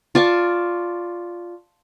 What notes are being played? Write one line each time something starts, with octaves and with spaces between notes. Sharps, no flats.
F4 D5 A5 C#6